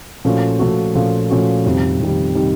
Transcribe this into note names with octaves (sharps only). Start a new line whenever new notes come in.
A#2 F3 A3 C#4 F#4
A#2 F3 A3 C#4 F#4
A#2 F3 A3 C#4 F#4
A#2 F3 A3 C#4 F#4
F2 C3 D#3 G3
F2 C3 D#3 G3
C3 D#3 G3